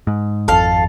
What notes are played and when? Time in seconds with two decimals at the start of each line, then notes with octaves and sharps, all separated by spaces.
0.07 G#2
0.48 G#1 F2 A4 F5